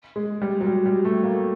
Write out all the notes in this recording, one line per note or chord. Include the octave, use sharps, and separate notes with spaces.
G#3
G3
F#3
G3
G3
A3
A#3